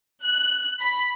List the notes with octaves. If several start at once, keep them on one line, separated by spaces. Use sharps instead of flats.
F#6
B5